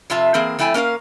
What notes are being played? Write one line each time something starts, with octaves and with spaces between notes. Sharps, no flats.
F2 C3 F4 E5 A5
E3 A#3 C4 G#4
F2 A3 E4 G5 G#5
A#3 C#4 A#4 D5 F5